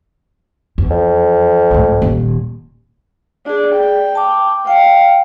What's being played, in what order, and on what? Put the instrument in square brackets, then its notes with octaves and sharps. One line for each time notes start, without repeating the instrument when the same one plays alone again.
[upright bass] E2
[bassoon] F2
[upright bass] C#2 A2
D#1 D#3
[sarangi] D4 [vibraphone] G#4 D5
[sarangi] G5
[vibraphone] A5 D6
[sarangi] F5 [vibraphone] G5